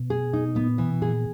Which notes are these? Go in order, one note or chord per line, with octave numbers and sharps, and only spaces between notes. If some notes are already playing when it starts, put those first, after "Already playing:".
Already playing: B2
G#4
D#4
A#2 B3
B2 E3
A#2 G#4